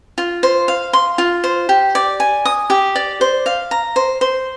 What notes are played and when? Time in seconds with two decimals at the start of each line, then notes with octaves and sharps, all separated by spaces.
0.18 F4
0.43 C5
0.68 F5
0.93 C6
1.18 F4
1.44 C5
1.69 G4
1.95 D5
2.20 G#5
2.45 D#6
2.70 G4
2.96 D5
3.21 C5
3.46 F5
3.71 A#5
3.96 C5
4.21 C5